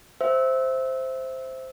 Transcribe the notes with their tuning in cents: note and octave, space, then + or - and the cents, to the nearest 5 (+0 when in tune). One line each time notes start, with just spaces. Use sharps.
C5 +0 E5 +0 E6 -15